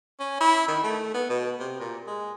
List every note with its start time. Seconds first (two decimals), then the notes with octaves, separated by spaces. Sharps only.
0.20 C#4
0.41 E4
0.68 D#3
0.84 A3
1.14 B3
1.30 B2
1.60 C3
1.80 A#2
2.07 G#3